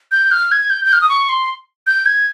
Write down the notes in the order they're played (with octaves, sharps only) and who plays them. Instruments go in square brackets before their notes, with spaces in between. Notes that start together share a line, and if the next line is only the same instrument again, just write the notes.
[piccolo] G6
F6
G#6
G6
G6
F6
D#6
C#6
C6
G6
G#6